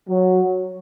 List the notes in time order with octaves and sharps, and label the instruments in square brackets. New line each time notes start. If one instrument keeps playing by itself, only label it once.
[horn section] F#3